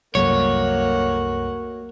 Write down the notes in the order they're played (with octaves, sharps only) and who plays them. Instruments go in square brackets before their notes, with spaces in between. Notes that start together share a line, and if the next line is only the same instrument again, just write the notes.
[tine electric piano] C2 F#2 [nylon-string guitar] F#3 A3 [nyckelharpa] A#3 F#5 [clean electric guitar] C#5